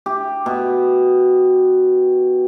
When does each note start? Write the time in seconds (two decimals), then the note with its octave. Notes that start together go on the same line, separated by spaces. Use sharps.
0.06 G4
0.46 B2